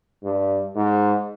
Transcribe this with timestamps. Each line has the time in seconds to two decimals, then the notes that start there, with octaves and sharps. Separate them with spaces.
0.23 G2
0.75 G#2